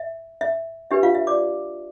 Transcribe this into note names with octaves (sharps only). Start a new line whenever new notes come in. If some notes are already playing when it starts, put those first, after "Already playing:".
Already playing: E5
E5
D4 G4 B4 E5
F4 F5
E5
D5 D6